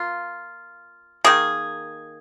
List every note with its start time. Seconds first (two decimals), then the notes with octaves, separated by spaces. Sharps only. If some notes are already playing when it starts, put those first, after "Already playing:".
Already playing: A#3 F4
1.24 D#3 A#3 G#4